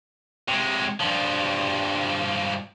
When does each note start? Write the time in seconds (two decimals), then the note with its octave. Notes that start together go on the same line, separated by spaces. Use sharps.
0.48 C3 G#3
1.00 G2 F3